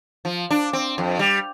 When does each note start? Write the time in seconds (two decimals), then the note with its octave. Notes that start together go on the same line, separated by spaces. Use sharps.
0.25 F3
0.51 D4
0.73 C4
0.98 F2
1.19 G3